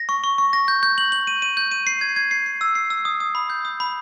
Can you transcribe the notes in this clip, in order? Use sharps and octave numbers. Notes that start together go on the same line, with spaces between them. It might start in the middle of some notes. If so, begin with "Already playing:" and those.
Already playing: A#6
C#6
C#6
C#6
A#6
G6
G6
F#7
F#7
D#7
D#7
G6
D#7
C7
G#6
G#6
C7
C7
E6
C7
E6
D#6
D#6
B5
G6
D#6
B5